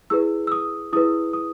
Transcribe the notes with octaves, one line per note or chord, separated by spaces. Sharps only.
E4 G#4 B4 E6
E6
D#6
E4 G#4 B4 D#6
D#6